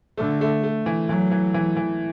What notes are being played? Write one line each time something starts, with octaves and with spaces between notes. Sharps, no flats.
D3 A3
A3
A3
E3
E3 F#3
E3
E3
E3